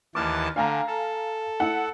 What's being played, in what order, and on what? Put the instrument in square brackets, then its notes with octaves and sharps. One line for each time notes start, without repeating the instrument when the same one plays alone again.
[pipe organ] D#2 E3 A5 [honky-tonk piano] D6 F6
[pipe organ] D3 [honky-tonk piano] F5 G#5 A#5
[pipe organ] A4
[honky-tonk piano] E4 F#5